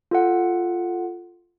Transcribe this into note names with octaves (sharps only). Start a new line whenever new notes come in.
F4 A4 F#5